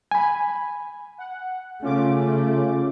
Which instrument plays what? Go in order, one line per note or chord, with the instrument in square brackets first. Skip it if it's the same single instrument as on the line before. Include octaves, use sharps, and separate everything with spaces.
[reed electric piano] G#5 B5
[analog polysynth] F#5
[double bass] C#3 A3 [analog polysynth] C#4 F4 D6